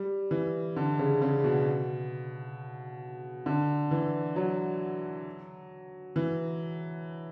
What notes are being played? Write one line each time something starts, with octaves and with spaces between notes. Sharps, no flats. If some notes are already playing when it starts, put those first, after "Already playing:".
Already playing: G3
E3
D3
C#3
C#3
B2
D3
E3
F#3
E3